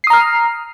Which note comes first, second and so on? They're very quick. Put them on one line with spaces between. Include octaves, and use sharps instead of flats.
C7 D#6 A#5 F6